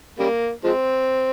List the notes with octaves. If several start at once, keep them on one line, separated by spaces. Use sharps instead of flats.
C#3 G3 A#3
F3 G#3 C4